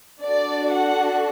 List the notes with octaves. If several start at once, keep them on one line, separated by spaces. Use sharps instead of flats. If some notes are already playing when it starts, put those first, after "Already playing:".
D4 F#4 A4 D5
F#5